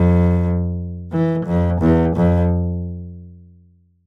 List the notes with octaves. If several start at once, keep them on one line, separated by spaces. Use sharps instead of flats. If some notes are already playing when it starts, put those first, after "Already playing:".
Already playing: F2
E3
F2
E2
F2